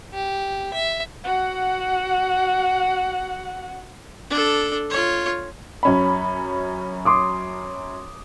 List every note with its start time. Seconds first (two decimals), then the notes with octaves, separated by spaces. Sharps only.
0.13 G4
0.74 E5
1.24 F#4 F#5
4.30 D4 A4
4.90 F4 C#5
5.83 F#2 C#4 B5
7.05 C6 D6 D#6